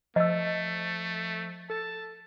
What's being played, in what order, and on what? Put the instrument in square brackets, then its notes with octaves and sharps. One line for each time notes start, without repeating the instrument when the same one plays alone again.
[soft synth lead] F3 [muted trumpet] A3 [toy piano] D#5 E6
[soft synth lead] A4 [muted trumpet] A5